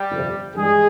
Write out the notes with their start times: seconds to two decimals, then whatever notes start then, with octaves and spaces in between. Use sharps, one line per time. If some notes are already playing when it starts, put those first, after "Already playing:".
Already playing: G3 G4
0.11 G1 F2 C3
0.56 G2 E3 G3 G#3 G#4